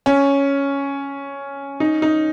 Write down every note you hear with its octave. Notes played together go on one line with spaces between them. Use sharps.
C#4
D#4
D#4